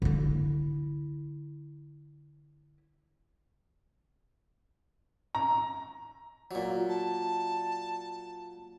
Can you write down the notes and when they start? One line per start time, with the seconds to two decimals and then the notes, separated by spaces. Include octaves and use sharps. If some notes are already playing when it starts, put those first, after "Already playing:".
0.02 D3 E4
5.35 A#5
6.51 A#2 F#3
6.89 A5